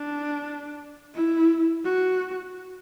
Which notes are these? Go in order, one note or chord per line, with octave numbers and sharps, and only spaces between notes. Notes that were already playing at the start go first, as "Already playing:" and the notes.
Already playing: D4
E4
F#4